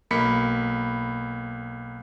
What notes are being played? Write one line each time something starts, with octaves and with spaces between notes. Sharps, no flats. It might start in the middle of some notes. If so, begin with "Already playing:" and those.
B1 A#3 B5 B6 C#7